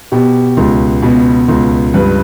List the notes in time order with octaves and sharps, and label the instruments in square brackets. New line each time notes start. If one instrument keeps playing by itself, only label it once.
[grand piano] B2 G4
C#2
B2
C#2
G2 B4